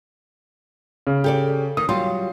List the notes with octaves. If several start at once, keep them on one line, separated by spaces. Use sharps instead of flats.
C#3
G4 A4 D5
D#3 D#6
F#3 G3 F4 C6